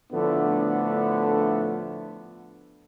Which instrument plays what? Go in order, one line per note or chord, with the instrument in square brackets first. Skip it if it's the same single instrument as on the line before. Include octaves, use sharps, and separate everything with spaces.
[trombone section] A2 D3 F3 A3 B3 D4